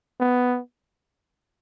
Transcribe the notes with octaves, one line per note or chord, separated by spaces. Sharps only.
B3